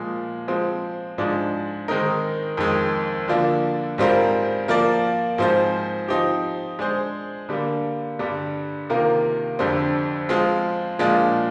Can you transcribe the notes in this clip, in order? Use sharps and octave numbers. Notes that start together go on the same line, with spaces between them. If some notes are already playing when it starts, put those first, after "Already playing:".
Already playing: A#2 F3 G#3
F3 G#3 C4
G#2 F3 G#3 D4
D#3 G#3 C4 D#4 A#4
F2 D#3 G#3
D3 F3 A#3 D4
G#2 G3 C4 F4 A#4
F3 A#3 F4 A#4 D5
G#2 F3 C4 F4 C5
F3 C4 D#4 G4
G#3 D4 G#4 C5
D3 G3 A#3
G2 D3 G3
C3 D#3 A#3 F4 A#4
F2 D3 G3 C4
F3 G#3 C4 F4
A#2 F3 G#3 D4 F4